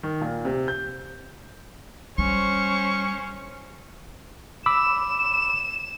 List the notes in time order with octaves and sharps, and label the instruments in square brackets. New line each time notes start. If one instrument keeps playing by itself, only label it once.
[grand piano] D#3
A#2
C3
G6
[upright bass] G3 [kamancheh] C#4 C5 [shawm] C#6
[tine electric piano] B5 D6 E6 [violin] E7